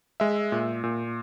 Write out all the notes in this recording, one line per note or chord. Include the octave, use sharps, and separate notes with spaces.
G#3 E5
A#2
A#2